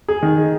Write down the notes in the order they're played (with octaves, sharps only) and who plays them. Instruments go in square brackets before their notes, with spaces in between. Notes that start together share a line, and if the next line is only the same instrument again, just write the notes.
[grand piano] G#4
D#3